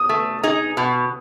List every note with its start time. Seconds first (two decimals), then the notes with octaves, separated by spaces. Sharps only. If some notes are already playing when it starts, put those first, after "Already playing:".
Already playing: D#6
0.09 A3
0.43 D#4 G#4
0.77 B2